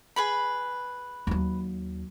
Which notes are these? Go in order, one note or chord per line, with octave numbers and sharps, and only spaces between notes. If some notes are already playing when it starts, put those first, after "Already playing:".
G#4 B4 B5
D#2 F#3